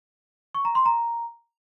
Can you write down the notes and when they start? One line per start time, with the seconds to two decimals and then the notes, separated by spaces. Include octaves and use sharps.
0.55 C#6
0.65 A#5
0.75 C6
0.86 A#5